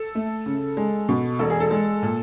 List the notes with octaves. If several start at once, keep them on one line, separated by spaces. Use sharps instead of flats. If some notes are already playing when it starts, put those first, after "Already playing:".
Already playing: A4
A3
C#3
G#3
B2
E1 A4
G#4
A4
G#3
A#2